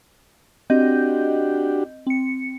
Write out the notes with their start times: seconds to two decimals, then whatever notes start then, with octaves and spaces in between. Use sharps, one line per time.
0.70 C4 D4 F#4 G4 D#5 G6
2.07 C4 C#7